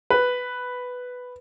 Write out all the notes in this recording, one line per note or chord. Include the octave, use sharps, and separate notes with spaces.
B4